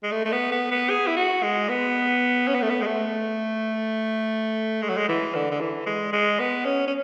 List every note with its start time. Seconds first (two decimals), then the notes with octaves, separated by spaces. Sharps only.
0.03 G#3
0.12 A3
0.25 A3
0.32 B3
0.52 B3
0.71 B3
0.90 G#4
1.07 E4
1.16 F#4
1.43 G#3
1.69 B3
2.48 C#4
2.54 B3
2.62 A3
2.70 B3
2.81 G#3
2.86 A3
4.82 G#3
4.89 F#3
4.97 G#3
5.09 E3
5.35 D3
5.51 D3
5.61 E3
5.86 G#3
6.13 G#3
6.40 B3
6.65 C#4
6.87 C#4